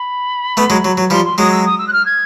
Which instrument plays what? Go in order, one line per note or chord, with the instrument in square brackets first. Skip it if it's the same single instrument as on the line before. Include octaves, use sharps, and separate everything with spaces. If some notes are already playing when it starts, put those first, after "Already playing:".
Already playing: [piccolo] B5
[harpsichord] A3 B3
F#3 G#3
F#3
F#3
[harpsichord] F3 G3 [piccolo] C6
[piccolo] C6
[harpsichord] F#3 G#3 [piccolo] D#6
[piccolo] E6
D#6
E6
F#6
F6
G#6